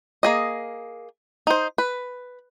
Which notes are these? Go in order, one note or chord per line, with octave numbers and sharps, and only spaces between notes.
A#3 G#4 D#5
D#4 C5
B4